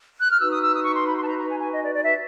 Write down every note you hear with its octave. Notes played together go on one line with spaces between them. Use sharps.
F#6
F6
D#4 F#4 B4 E6
D#6
E6
D#6
C#6
C6
B5
C6
A5
A#5
A#5
G#5
G#5
D#5
D5
D5
E5